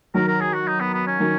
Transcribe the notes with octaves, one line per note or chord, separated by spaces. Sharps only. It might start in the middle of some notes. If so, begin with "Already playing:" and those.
D#3 F#3 A#4
A#4
G#4
F#4
D#4
B3
B3
C#4
D#3 F#3